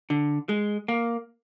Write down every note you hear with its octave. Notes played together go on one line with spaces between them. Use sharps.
D3
G#3
A#3